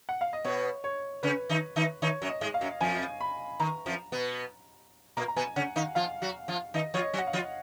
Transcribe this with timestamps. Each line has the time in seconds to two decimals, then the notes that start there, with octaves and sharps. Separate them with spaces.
0.09 F#5
0.21 F5
0.33 D#5
0.44 B2 B3 C#5
0.84 C#5
1.23 C#3 C#4 B4
1.49 D#3 D#4
1.76 D#3 D#4
2.02 D#3 D#4 C#5
2.22 F#2 F#3
2.28 D#5
2.41 G#2 G#3
2.54 F5
2.61 F#2 F#3
2.80 F2 F3 G#5
3.21 B5
3.60 D#3 A#5
3.86 F2 F3
4.12 B2 B3
5.17 A#2 A#3 A#5
5.28 A#5
5.36 B2 B3 G#5
5.56 C#3 C#4 F#5
5.76 D#3 D#4 F5
5.95 F3 F4 F5
6.22 F#3 F#4
6.48 F3 F4
6.74 D#3 D#4 D#5
6.94 F3 F4 C#5
7.01 D#5
7.13 F#3 F#4
7.18 F#5
7.27 F5
7.33 F3 F4